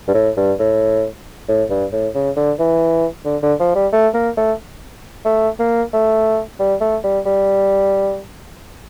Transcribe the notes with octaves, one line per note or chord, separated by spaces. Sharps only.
G2
A2
G2
A2
A2
G2
A2
C#3
D3
E3
D3
D3
F3
G3
A3
A#3
A3
A3
A#3
A3
G3
A3
G3
G3